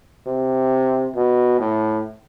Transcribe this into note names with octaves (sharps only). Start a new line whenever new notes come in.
C3
B2
A2